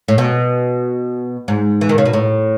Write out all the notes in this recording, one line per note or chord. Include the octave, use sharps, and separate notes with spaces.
A2
B2
G#2
E3
D#3
C#3
B2
A2